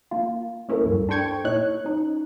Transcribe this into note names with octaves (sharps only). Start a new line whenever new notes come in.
A#3 F4
A#3 C#4 E4 A4 A#4
D2 G2
D4 A4 C5 G5 C#6 G#6
A#2 D#4 E4 C#5 F#6
C#4 D#4